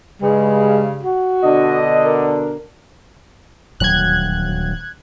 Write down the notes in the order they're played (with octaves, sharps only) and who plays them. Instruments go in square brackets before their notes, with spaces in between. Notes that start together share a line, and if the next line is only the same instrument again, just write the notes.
[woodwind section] G2 C#3 [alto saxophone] G#3
[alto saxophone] F#4
[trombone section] B2 D3 D4 [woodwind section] D#5
[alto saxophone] A#4
[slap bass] D#1 D2 F#3 [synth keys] F#6 G#6